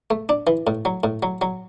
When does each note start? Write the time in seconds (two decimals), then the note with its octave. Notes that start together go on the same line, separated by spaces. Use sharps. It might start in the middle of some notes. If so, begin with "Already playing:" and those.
0.10 A3
0.29 D4
0.47 E3
0.67 A2
0.85 F#3
1.04 A2
1.23 F#3
1.41 F#3